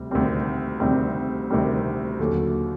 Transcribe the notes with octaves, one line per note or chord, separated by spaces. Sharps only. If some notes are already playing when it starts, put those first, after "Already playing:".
Already playing: D2 C3 G3
D2 C3 D#3 G3 C4
D2 C3 D#3 G3 C4
D2 C3 D#3 G3 C4
D#2 D3 F#3